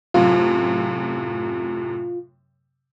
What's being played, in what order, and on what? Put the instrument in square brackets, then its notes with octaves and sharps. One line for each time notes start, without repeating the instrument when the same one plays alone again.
[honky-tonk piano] F#2 A2 C3 [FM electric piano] F4